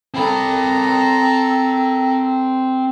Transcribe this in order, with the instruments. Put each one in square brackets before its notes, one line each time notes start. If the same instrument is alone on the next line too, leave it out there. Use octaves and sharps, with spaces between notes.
[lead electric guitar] C4 B5 [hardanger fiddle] A4 A#5